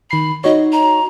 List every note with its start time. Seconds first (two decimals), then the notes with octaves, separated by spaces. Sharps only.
0.11 D#3 B5 C7
0.44 D#4 F#4 C#5 D#5
0.72 A#5